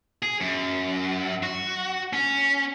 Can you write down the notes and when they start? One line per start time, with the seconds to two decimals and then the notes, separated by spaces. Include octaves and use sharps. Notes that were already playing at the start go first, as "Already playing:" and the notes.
0.23 G#4
0.41 F#2
1.43 F#4
2.13 C#4